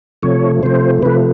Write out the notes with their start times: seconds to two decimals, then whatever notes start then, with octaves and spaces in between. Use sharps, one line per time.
0.23 C3 F3 A3 C#5
0.63 C3 F3 A3 C5
1.02 C3 F3 A3 B4